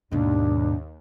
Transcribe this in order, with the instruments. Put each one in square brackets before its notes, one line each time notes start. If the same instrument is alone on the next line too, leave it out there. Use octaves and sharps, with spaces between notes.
[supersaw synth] D#2 [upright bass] G#2 B2 [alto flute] D4